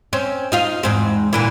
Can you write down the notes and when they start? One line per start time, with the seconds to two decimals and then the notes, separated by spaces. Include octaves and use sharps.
0.13 C4 C#4
0.52 D#4 F4 F5
0.83 E2 G#2 C4
1.33 A#2 D3 E3